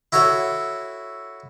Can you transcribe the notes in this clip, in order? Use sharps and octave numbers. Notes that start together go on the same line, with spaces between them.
E4 F#4 A4 C#5